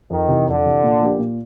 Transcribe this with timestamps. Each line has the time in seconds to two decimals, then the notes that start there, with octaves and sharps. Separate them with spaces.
0.10 F2 D#3
0.28 C3 E3
0.47 F2 D3
0.66 C3 E3
0.84 A#2
1.01 F3 A#3 D4 G4
1.19 A#2